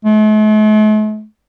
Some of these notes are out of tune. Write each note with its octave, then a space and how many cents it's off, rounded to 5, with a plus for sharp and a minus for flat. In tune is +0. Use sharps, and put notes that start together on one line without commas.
A3 -45